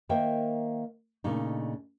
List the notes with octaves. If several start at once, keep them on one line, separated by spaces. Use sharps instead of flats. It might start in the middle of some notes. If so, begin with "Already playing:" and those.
D#3 A#3 A#4 C5 E5 G5
A#2 C#3 A3 D4 D#4